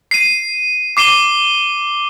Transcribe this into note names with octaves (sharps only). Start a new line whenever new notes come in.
C7 D#7
D6 C7 D#7 G7